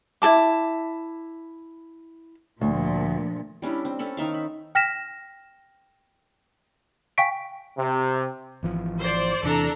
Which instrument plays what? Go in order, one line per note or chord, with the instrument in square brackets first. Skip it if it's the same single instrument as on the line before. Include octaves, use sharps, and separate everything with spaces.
[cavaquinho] E4 A4 A5 D6
[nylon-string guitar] D2 [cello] A#2 F3
[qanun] G3 C#4 D4 E4
C4
C4 C#4 A4 B5
D#3 D#4 E5 F5
B5
[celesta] G5 F6 A#6 B6 E7
F5 G5 G#5 C#6 B6 D7
[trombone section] C3
[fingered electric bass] G#1 E3 F3
[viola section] C5 D5
[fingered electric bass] E2 C3 E3 [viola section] D4 A4 A#5